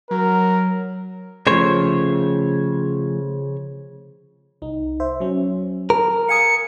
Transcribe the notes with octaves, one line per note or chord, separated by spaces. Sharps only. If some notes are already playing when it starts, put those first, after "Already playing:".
F#3 A#4
C#3 F3 A3 C5 C#5
C2 D#4
C5 E5
F#3 C#4
A#4
F5 G#5 D#6 C#7